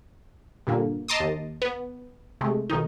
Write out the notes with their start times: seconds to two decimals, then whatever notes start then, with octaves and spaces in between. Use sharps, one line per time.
0.67 G2 A#2 D3 A#3
1.08 D#5 A5 A#5 C6 D6 D#6
1.20 D#2
1.62 B3
2.41 C3 G#3 A3
2.70 B1 D#3 D#4